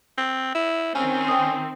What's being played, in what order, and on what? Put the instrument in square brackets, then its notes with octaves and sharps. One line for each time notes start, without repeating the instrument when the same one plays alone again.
[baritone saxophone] C4
E4
[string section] D#3 C4 [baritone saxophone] C#4
[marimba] G5 D#6